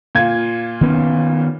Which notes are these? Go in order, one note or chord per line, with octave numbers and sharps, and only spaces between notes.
A#2 F4 G#6
D#3 B3 C#4